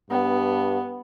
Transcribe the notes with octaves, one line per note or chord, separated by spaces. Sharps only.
G2 B3